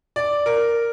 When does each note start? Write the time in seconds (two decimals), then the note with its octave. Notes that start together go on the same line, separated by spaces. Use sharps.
0.16 D5
0.46 A#4